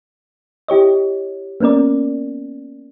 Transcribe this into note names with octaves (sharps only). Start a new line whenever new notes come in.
E4 G4 C#5 D#5
A#3 B3 C#4 A#4 D5